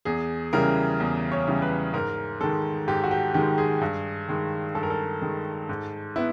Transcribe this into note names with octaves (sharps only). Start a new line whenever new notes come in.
E2 G#4
C#3 E3 G3 A#4
E2
C#5
C#3 E3 G3
B4
G#2 A#4
D#3 G#3 A4
G#2 G4
F#4
G4
D#3 G#3 G4
G#4
G2
D#3 G#3
G2 A4
A#4
A4
D#3 G#3
G#2
B3 E4